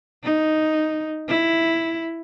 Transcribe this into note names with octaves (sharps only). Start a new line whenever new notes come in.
D#4
E4